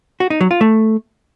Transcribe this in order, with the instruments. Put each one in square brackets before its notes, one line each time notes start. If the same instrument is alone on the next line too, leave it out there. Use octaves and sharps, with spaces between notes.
[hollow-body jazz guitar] F#4
D#4
F#3
F4
A3